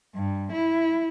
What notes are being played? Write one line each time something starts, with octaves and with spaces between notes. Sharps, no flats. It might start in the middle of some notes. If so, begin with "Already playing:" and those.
G2
E4